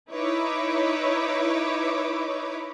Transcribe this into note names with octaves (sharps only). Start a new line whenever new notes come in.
D#4 E4 B4 C#5 D6